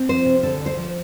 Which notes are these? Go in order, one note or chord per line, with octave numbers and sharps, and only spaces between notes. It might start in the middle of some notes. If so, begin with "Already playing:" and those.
Already playing: C4
F3 C5
C3
D3 A4
D2
C5
F3